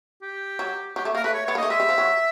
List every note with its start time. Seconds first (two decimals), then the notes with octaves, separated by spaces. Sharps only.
0.22 G4
0.59 F#3
0.96 F#3 G4
1.05 A3
1.15 A#3 A#4
1.24 A3 B4
1.34 C#5
1.46 B3 C#5
1.55 A#3 D#5
1.63 A3
1.70 G#3 E5
1.80 G3
1.89 F3
1.98 F#3